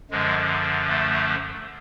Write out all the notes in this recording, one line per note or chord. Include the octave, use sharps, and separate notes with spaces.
F#2 D3 F3 G#3
A3